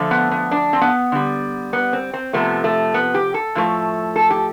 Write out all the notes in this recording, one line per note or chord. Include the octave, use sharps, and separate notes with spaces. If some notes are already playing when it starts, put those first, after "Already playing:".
Already playing: D3 F3 A3
B3
B3
D4
C4
B3
D3 G3
B3
C4
C4
C3 F3 A3 B3
A3
B3
G4
A4
A2 F3 A3
A4
G4